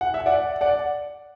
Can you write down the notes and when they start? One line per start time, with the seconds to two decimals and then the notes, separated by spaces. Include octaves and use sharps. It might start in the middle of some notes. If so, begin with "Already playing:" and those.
0.01 F#5
0.14 E5
0.26 D5 F#5
0.61 D5 F#5